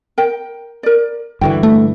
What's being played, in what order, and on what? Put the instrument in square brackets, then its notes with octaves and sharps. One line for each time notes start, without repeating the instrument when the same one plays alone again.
[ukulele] A#4 G5
A#4 D5
[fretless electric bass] G2 D3 E3 [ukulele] F#4 G5
[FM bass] A3